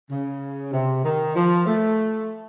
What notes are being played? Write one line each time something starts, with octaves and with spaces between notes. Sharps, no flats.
C#3
C3
D#3
F3
A3